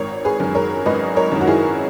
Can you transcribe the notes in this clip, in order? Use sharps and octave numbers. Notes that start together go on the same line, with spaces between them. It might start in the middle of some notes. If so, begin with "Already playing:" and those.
Already playing: G#1 A#4 C#5
G#4 B4
F#2 D#3
A#4 C#5
G#1 B4 D#5
A#4 C#5
F#2 D#3
F#4
E4 G#4